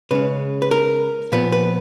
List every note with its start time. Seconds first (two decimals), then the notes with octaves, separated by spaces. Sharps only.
0.11 C#3 G#3 C#4 B4
0.62 B4
0.71 A#4
1.32 A#2 F3 B3 B4
1.52 B4